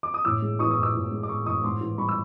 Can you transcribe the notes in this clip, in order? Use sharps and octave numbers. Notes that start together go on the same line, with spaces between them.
D6
D#6
A2 D6 E6
G#3
E3 C#6 D#6
C#6 D#6
A2
D6 E6
A2
G#3
D6
A2 C#6 D#6
A2 C#6 D#6
G#2 C6 D6
E3
G3 B5 C#6
E6